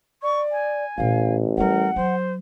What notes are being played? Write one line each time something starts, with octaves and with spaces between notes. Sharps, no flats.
D5 C#6
G#5
A1 A#2 D4 F5
G3 D4 A#4 F#5
F#3 C5